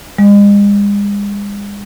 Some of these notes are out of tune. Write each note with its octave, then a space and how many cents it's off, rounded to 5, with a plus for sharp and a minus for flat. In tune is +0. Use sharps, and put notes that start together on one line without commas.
G#3 -40